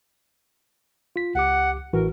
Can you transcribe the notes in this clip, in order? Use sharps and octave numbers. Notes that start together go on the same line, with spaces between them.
F4 B6
C#2 G4 F#5 D6
A1 E3 F#4 A#4